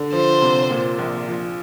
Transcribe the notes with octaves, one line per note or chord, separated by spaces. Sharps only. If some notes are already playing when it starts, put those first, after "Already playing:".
Already playing: D3
F3 C5
C3
A#2
A#1
F3